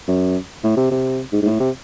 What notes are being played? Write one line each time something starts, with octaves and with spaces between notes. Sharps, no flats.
F#2
A2
C3
C3
G#2
G#2
A2
C3